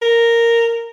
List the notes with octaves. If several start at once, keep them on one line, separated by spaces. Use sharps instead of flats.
A#4